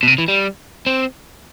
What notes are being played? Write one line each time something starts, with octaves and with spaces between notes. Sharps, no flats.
B2
C3
E3
G3
C4